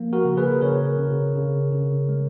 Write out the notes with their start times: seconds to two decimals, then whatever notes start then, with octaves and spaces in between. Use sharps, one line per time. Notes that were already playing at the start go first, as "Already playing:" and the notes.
Already playing: F3 A#3
0.13 F#4 A#4
0.25 C#3
0.37 G#4 B4
0.61 C#3 A#4 C#5
0.99 C#3
1.36 C#3
1.72 C#3
2.09 G#3